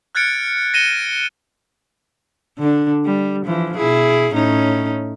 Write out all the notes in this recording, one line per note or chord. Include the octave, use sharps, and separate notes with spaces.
F6 F#6 G#6 A6 C#7 D7
A#6 C#7 D#7 E7 G7
D3 D4
G3
E3 F3
B2 E4 G#4
A2 C#4 D#4